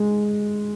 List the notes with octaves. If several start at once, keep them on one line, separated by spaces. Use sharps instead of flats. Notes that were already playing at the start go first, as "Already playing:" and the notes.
Already playing: G#3